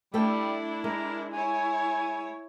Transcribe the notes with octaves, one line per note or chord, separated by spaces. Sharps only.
G3 A3 D4 E4 A4 G5
G#3 A#4
E4 C#5 G#5